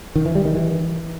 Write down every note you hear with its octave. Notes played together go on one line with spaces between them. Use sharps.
D#3
E3
G3
D#3
E3